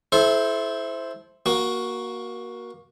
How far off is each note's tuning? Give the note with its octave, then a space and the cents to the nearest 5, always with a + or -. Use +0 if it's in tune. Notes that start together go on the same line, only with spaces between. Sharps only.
E4 +0 A4 -30 C5 +0
A#3 +20 F#4 +0